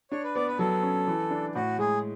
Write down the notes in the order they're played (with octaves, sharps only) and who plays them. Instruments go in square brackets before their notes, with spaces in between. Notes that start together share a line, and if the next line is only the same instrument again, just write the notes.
[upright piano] D4 [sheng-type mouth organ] C#5
[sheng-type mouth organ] B4
[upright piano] B3 [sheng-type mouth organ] D5
[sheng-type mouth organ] B4
[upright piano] F#3 [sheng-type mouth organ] A4
[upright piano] C#4
E3
D4
[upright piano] A2 [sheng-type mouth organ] F#4
[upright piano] G#3 [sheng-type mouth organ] G#4